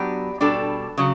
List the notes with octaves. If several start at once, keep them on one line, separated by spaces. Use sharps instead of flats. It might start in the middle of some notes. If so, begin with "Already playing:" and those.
Already playing: F#3 B3 D4 G4
B2 G3 D4 A4
C#3 F#3